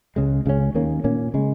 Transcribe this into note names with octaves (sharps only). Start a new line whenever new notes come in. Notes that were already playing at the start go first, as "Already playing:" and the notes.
C#2 C#3 G#3
C#2 C#3 F#3 C#4
D#2 D#3 A#3 C#4
A#2 A#3 C#4
C#3 G#3